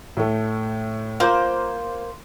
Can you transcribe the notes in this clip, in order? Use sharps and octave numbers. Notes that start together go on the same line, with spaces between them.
A2 A3
A#3 F4 C5